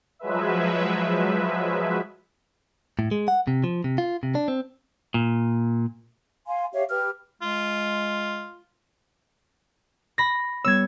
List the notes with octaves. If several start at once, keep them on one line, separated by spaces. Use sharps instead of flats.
F3 F#3 G#3 B4 E5
A2
G#3
F#5
C3
F3
C3
F4
C3
D4
C4
A#2
F5 G#5 C6
G4 C#5 E5 F5
G4 B4 F6
G#3 F4
B5 A#6
G3 B3 C#5 E6 G#6